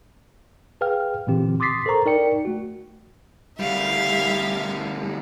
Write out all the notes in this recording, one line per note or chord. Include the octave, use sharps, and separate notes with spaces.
G#4 B4 F5 G5 F6
A#2 D3 E3 C4 G4
C6 D6 D#6 A6 B6 C7
A4 A#4 C5 A#5 C#6
D#4 A#4 D5 G5 C#7
A3 F#4
D2 G3 E5 F5